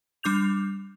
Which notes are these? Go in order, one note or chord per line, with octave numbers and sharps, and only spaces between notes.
G3 D4 D6 G6 F7